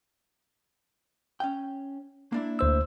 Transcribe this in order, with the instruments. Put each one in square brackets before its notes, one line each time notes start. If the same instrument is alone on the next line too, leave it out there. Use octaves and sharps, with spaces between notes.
[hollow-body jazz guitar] C#4 G5
A#3 D4 E4
[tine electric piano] D2 C5 E6